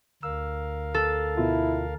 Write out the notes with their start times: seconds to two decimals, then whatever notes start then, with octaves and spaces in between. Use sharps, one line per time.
0.23 D2 A#4 F5 E6
0.94 A4
1.37 B2 E4 F4